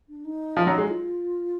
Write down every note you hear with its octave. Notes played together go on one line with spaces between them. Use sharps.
D4
D#4
F3
F#3
G#3
F4